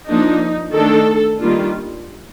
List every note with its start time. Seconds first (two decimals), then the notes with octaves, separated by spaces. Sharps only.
0.08 F3 A#3 D4 D#4
0.74 D#3 A3 D4 A4
1.40 D#3 G3 A#3 D4 F4